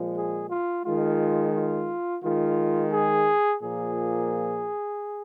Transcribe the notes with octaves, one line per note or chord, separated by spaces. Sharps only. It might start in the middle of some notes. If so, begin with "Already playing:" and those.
Already playing: A#2 F3 G#3
G#4
F4
D#3 G#3 F4
F4
D#3 G#3 F4
G#4
A#2 F3 A#3 G#4